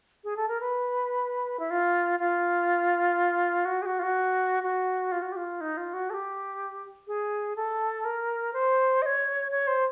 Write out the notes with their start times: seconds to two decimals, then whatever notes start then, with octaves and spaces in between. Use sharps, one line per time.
0.24 G#4
0.36 A4
0.48 A#4
0.60 B4
1.59 E4
1.70 F4
2.19 F4
3.65 F#4
3.82 G#4
3.86 F#4
3.99 F4
4.03 F#4
4.63 F#4
5.12 F4
5.22 F#4
5.32 G4
5.36 F4
5.61 D#4
5.77 F4
5.93 F#4
6.10 A4
6.14 G4
7.07 G#4
7.56 A4
8.05 A#4
8.53 C5
9.02 D#5
9.06 C#5
9.51 C#5
9.67 C5